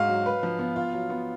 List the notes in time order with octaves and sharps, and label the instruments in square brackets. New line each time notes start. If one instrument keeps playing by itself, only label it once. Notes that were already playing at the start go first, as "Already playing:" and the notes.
Already playing: [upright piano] G#2 F#4 [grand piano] F5
[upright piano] F#3
B4
F3
B3
F4
F#3
B3